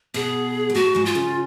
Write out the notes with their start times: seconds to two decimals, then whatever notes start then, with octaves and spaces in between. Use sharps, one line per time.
0.14 B2 B3 G#4
0.70 G#3
0.75 A2 A3 F#4
0.95 G#2 G#3
1.05 F4
1.15 C#3 C#4